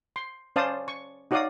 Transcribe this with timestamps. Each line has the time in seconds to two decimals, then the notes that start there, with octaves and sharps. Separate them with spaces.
0.16 C6
0.56 C#4 C5 D5 F5 A5 D#6
0.88 C#6
1.31 D#4 F#4 C#5 D5 F5 D#6